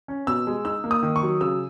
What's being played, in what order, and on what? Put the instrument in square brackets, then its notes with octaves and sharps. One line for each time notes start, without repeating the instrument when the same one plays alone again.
[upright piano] C#4
B2 E6
G#3
D#4 E6
A#3
D#6
D#3
C#6
F#3
C#3 E6